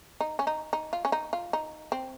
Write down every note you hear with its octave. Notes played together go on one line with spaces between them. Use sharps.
D#4
C#4
D#4
D#4
F4
C#4
D#4
F4
D#4
C4